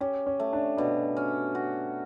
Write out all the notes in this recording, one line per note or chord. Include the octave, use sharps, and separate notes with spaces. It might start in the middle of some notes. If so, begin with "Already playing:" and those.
C#4 G4
C#4
A3
D4
B2 D4
C#4
F#4